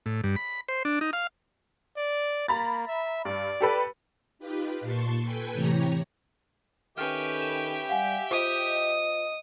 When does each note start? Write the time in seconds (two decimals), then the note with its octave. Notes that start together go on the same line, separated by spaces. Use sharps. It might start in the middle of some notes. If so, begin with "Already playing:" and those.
0.06 A2
0.24 G2
0.36 B5
0.69 C5
0.85 D4
1.01 D#4
1.13 F5
1.97 D5
2.48 A#3 A#5 B5 A6
2.87 E5
3.25 G2 D5
3.61 G4 A4 B4
4.39 D#4 F4 G4 B4
4.81 A#2 A5 C6 C#6
5.23 A4 B4 G5 G#5
5.53 A2 C3 E3 G4 C#5 A#5
6.98 D#3 C#4 G4 A4 B4 E5 G5 F6
7.41 E7
7.89 G3 F5 F#5 G#5
8.31 F4 C5 D#5 D#6